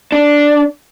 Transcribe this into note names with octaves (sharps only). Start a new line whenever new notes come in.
D4